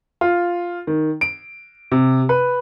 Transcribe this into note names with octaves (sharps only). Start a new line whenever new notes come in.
F4
D#3
D7
C3
B4